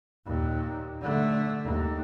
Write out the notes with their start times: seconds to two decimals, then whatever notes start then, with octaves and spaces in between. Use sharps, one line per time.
0.25 D#2 A#2
1.01 D3 A3
1.64 D#2